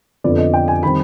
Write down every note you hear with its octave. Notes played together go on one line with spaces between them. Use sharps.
F2 D3 F3 B3 D5
D#5
G5
G#5
D#3 G3 C4 B5